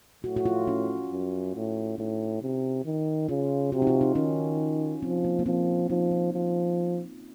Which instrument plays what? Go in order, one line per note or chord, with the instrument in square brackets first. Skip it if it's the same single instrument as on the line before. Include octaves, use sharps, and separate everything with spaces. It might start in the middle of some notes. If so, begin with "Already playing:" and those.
[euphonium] A2 [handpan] F#4
[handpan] F#4
F4
C#4
[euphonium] F#2
A2
[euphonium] A2 [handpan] D#4
[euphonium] C3
D#3
[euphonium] C#3 [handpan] F4
[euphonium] C3 [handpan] F#4
[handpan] D#4
F4
D#4
[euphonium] D#3 [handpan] C#4
[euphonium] F3 [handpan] C4
[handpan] A#3
A#3
[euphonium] F3 [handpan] C4
[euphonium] F3 [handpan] D#4
[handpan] F4
[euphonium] F3